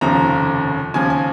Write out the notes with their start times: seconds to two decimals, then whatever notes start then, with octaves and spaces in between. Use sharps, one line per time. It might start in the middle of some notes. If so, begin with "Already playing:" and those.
0.01 F1 D#2 C#3 F3 A#5
0.94 D#2 C#3 F3 G#5
1.10 G#5